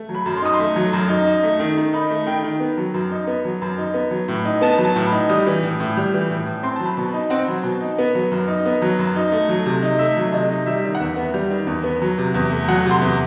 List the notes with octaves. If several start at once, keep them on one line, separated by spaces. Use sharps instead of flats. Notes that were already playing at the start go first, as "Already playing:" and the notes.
Already playing: A3
F#3
B5
F#2
C6
D#4 D#6
C6
A3
F#3
F#2
D#4
D#4
A3
D#3
D#3
D#4 B5
A3
D#3 G5
D#3
B3
F#3
F#2
D#4
B3
F#3
F#2
D#4
B3
F#3
A2
D#4
B3 A5
F#3
A5
A2
B5
D#4
G3 D#6
E3
A2
A2
G3
E3
A2
A2
C4 C6
F#3 A5
B5
B2
B5
D#4
C4 F#5
F#3
B2
D#4
B3
F#3
F#2
D#4
B3
F#3
F#2
D#4
A3
F#3
C3
D#4
A3 E5
F#3
C3 D#5
D#4
G3 E5
D#3
F#5
E2 E5
B3
G3
D#3
E2
B3
F#3
C3
E2
A3
F#3 F#5
C3 C6
E2